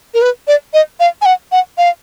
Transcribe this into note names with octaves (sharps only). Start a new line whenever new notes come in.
A#4
B4
D5
D#5
F5
G#5
F#5
F#5
F5